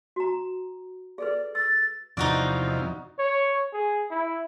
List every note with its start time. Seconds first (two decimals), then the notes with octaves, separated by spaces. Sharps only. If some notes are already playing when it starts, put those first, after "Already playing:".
0.16 F#4 A#5
1.18 G#4 A4 B4 D5
1.55 E6 A6
2.17 E2 C3 F3 D#4 F#4 D5
3.19 C#5
3.73 G#4
4.10 E4